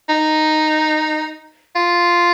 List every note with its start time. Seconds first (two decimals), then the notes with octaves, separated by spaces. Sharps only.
0.09 D#4
1.76 F4